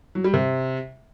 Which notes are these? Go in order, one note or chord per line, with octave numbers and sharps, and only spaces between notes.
F#3
G3
C3